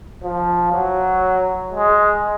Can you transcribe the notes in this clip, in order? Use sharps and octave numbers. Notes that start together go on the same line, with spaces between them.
F3
F#3
G#3